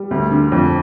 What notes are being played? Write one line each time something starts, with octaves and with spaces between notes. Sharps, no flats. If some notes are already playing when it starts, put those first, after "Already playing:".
Already playing: G3
D2
D3
F2